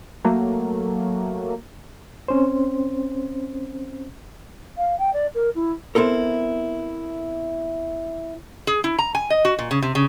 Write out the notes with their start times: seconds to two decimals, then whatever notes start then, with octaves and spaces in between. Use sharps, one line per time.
0.25 F#3 A3 A#3
2.28 C4 C#4 C5
4.77 F5
4.99 G5
5.13 D5
5.35 A#4
5.55 E4
5.95 B3 C4 E4 A4 A#4
8.67 G#4
8.84 E4
8.99 A#5
9.15 G#5
9.30 D#5
9.45 F#4
9.59 A#2
9.71 C#3
9.82 C3
9.95 C#3